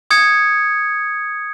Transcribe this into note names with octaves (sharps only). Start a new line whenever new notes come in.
D#6 G#6 C#7